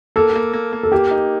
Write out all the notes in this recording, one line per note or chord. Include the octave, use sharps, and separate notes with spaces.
A#3 A4
A#3
A#3
A#3
A4
A#3 G4
D#4